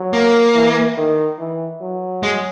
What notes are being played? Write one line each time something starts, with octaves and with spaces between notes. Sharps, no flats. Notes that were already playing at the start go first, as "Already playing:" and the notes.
Already playing: F#3
A#3
E3
D#3
E3
F#3
G#3